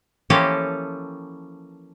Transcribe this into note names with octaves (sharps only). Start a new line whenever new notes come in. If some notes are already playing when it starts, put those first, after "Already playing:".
E3 F3 A#3 C#4 G4 A4